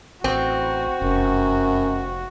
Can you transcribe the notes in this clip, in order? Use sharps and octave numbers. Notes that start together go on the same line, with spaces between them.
A1 C4 F#4
F1 F#2